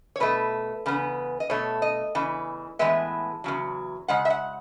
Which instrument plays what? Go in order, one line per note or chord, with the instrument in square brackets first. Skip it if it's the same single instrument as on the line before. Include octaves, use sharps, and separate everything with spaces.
[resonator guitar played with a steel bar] C#5
B2 A3 B4
E2 C#3 B3
D#5
B2 A3 C#5
D#5
E2 C#3 E3
A2 E3 G#3 B3 E5
E2 C#3 F#3
C#3 G#3 F#5
E5
F#5